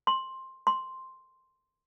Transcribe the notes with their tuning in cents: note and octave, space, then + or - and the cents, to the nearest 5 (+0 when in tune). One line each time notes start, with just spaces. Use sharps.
C6 +10
C6 +0